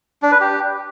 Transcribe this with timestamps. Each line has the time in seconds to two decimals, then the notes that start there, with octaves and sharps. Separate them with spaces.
0.23 D4
0.32 B4
0.41 G4